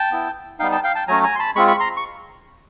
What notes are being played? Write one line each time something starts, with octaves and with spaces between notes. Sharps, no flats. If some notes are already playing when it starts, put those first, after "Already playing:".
Already playing: G5 A5
B3 E4
G3 B3 D#4 F5 G5
G5 A5
F5 G5
G5 A5
F#3 A3 C#4 G#5 A#5
G#5 A#5
C6
A5 B5
G#3 C4 F4 B5 C#6
B5 C#6
A#5 C6
C#6